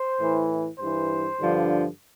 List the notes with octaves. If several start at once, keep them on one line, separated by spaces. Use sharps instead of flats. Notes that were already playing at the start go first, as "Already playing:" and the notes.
Already playing: C5
A2 E3
G2 E3 C5
G2 D3 F3